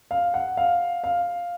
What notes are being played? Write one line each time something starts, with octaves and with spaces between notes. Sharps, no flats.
F5
F#5
F5
F5